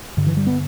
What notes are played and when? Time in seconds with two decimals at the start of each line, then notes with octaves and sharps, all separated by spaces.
0.17 G2 D3
0.26 E3
0.37 G3
0.47 B3